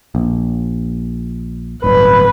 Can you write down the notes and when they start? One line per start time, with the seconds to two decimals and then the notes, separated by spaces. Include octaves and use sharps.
0.15 A#1
1.84 D1 G1 B4